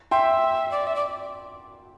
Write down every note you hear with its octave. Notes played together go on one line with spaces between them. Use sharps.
E5 G5 C6
D5
E5
D5